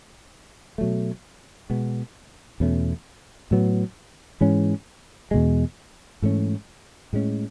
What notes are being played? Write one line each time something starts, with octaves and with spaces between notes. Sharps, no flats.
B2 F#3 A3
B2 G#3 B3
E2 B2 A3 C#4
A2 F#3 B3
G#2 E3 G#3 C#4
E2 B2 G#3
G#2 E3 A3 C#4
A2 G#3 C#4